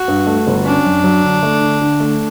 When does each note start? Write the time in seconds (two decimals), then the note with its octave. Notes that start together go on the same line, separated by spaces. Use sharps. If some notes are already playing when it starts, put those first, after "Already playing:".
Already playing: F#4
0.08 G2
0.27 A3
0.47 G1
0.66 C#4 D4
0.85 F#2
1.04 F#3
1.23 D3
1.43 A3
1.62 D3
1.81 D3
2.00 A3